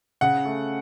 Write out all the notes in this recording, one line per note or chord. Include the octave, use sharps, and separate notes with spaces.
C#3 F#5
A3